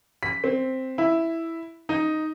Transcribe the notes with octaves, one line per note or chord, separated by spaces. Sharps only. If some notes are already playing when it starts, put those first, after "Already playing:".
B6
C4
E4
D#4